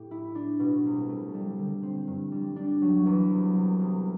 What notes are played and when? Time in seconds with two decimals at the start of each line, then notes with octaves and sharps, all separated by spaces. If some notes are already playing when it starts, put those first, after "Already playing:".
Already playing: A2 G4
0.11 E4
0.35 D4
0.60 B2
0.85 C2
1.09 A3
1.34 G3
1.58 D3
1.83 C4
2.08 G2
2.32 G3
2.56 D4
2.82 F#3
3.06 E2
3.30 C2
3.55 C2
3.79 C2